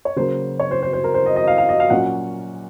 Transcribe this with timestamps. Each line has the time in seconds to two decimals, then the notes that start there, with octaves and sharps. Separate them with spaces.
0.05 C#5
0.16 C#3 F#3 A#3 C5
0.60 C#5
0.71 C5
0.82 C5
0.93 C5
1.04 A#4
1.14 C5
1.26 D#5
1.36 D#5
1.47 F5
1.58 F5
1.69 D#5
1.80 F5
1.90 A#2 F#3 C#4 F#5